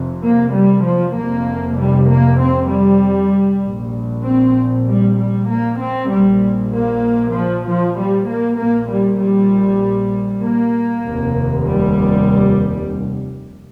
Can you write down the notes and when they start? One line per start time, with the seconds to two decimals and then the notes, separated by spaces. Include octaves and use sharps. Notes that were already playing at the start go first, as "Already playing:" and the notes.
Already playing: F1 F2 C3
0.23 A#3
0.54 G3
0.85 F3
1.15 F1 F2 C3 A#3
1.78 G3
2.08 A#3
2.39 C4
2.70 G3
3.63 A#1 A#2
4.24 C4
4.87 G3
5.18 G3
5.49 A#3
5.80 C4
6.10 A#1 A#2 G3
6.72 A#3
7.34 F3
7.65 F3
7.95 G3
8.26 A#3
8.58 A#1 A#2 A#3
8.89 G3
9.19 G3
10.43 A#3
11.05 F1 D#2
11.66 G3